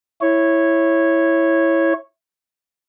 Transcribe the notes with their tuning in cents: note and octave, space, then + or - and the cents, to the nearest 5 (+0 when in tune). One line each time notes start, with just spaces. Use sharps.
E4 +0 C#5 -10